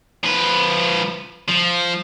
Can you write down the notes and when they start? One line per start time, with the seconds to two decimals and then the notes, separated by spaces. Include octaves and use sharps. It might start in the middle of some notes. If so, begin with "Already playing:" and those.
0.24 F3 B4
1.49 F3